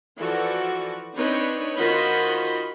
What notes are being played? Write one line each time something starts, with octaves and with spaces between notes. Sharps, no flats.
E3 F3 F#4 A4 D5
C4 D4 D#4 B4 C#5
D#3 F4 F#4 C5 D#5 B5